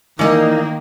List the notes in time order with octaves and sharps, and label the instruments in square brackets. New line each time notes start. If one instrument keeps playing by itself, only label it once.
[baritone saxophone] D#3 [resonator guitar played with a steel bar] E3 D5 D#5 [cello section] A#3 [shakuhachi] D#4